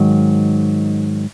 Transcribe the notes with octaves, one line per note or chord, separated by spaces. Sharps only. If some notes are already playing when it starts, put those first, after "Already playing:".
Already playing: G#2 D#3 F#3